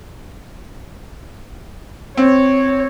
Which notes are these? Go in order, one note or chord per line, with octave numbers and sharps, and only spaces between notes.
C4 C#5